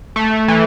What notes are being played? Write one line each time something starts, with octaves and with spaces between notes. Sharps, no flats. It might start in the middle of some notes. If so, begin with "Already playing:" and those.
A3
E3